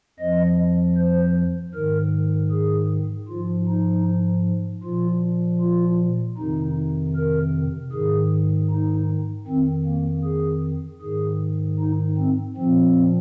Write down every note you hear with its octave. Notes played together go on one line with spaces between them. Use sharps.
F2 F3 D#5
C5
G#2 D#3 A#4
G#4
G#2 F3 F4
D#4
A#2 F3 F4
F4
F2 C3 D#3 D#4
A#4
G#2 D#3 G#4
D#4
F2 D#3 C4
A#3
G#4
G#2 D#3 G#4
D#4
C4
A#2 F3 C4